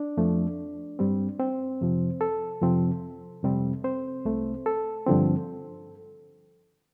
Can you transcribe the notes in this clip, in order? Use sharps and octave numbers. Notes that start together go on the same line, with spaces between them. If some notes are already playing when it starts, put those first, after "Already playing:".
Already playing: D4 D5
F2 F3 A3
G2 G3 C4
C4 C5
F2 C3 F3
A4
F2 C3 F3 C4
F2 C3 G3 C4
C4 C5
C2 C3 A3
A4
G2 D3 F3 C4